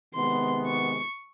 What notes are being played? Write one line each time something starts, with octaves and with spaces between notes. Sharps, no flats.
C3 D#3 G#3 B3 C6
C#6